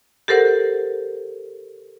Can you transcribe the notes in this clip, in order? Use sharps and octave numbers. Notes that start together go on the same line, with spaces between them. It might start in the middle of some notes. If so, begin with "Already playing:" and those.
G4 A4 A#4 C5 F#5